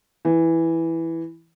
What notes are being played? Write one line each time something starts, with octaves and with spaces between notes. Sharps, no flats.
E3